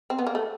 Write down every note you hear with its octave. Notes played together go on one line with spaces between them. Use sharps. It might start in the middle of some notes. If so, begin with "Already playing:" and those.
C4
B3
A#3
A3